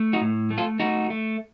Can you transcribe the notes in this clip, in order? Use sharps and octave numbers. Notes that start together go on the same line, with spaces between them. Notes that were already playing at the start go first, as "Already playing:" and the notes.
Already playing: A3
D#4 F#4
A2
A3
F4 A4
A3 D#4 F#4
A3